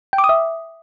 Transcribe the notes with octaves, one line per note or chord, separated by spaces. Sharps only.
G5
D6
D#6
E5